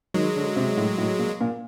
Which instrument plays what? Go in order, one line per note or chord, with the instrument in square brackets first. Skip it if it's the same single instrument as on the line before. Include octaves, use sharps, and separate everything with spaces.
[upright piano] D#3 [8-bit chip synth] F#3 G#3
[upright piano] D3
C3
A2
A2
A#2
A#2